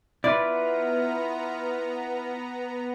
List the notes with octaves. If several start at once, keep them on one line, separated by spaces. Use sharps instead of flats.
B3 E4 F4 B4 D5 A#5